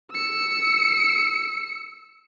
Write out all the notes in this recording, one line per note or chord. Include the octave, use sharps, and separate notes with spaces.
E6 C#7